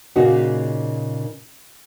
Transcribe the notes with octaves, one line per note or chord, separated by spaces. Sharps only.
A#2 C#3 A#3 D#4 F#4